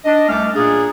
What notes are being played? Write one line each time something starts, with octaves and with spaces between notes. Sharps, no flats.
D4 D#5
C2 A3 C#4 D6 F6
A#2 A#3 D4 G#4